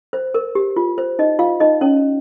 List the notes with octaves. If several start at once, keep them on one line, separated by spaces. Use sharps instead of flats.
C5
A#4
G4
F4
C5
D#4 D#5
F4 F5
D#4 D#5
C#4 C#5